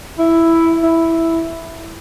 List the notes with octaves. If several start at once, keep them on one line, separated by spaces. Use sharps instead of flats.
E4
E4